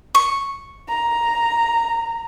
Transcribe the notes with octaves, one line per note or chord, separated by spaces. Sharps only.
C#6
A#5